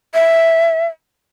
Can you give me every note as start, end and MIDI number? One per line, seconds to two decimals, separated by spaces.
0.14 0.87 76